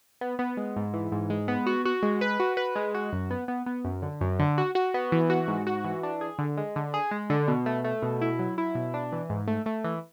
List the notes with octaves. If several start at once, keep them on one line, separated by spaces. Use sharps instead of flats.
B3
B3
G#3
G#2
E3
G#2
G#3
B3
F#4
F#4
G#3
B4
F#4
B4
G#3
F#4
F#2
B3
B3
B3
F#2
D3
F#2
D3
F#4
F#4
B3
E3
F#4
G#2
F#4
E3
D4
G#4
D3
G#3
D3
G#4
G#3
D3
B2
A3
A3
B2
E4
F#3
E4
B2
D4
E3
G#2
A3
A3
E3